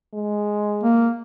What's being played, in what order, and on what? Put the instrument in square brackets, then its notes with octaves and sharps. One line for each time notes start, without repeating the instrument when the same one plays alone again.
[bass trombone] G#3
[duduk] A#3